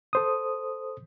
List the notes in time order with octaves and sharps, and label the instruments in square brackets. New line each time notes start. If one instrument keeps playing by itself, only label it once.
[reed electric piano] A4 C5 D#6